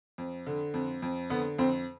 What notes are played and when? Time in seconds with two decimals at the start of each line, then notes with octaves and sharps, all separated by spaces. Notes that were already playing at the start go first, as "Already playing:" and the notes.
0.18 F2
0.46 D3
0.74 F2
1.02 F2
1.30 D3 B3
1.59 F2 C4